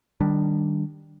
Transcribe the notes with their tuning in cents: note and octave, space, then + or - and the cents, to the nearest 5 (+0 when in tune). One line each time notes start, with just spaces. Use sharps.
D#3 -15 G3 +0 D4 +0